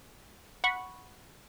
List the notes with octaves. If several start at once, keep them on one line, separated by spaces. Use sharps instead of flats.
F#5 B5 C#6